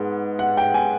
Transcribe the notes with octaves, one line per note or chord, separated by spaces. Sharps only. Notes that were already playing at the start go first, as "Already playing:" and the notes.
Already playing: G#2 B3
F#5
G5
G#5